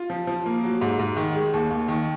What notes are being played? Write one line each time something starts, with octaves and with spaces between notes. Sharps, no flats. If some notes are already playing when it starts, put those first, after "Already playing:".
Already playing: F4
F3
F3
A#3
F#3
G#2
G#2
D#3
G#3
D#2
D#2
D#3